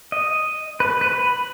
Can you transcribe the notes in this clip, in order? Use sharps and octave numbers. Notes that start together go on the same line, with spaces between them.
D#5
B4
B4
B5